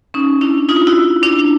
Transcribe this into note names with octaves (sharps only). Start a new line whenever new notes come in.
C#4 D#4
D4 E4
D#4 F4
E4 F#4
D4 E4